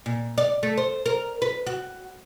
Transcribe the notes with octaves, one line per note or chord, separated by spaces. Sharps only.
A#2
D5
A3
C5
A#4
B4
F#4